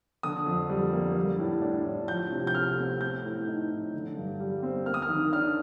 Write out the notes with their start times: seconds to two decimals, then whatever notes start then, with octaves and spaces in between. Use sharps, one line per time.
0.23 D3 D#6
0.46 F2
0.70 G3
0.93 A#3
1.16 G3
1.39 A2
1.62 D4
1.85 A2
2.08 F3 G6
2.31 C3
2.47 G6
2.54 A3 F6
2.78 C4
3.01 A3 G6
3.25 A2
3.47 D#4
3.71 A2
3.93 D3
4.17 G2
4.40 G3
4.63 C4
4.86 A#3 F6
4.94 D#6
5.02 F6
5.09 D#3
5.33 D4 F6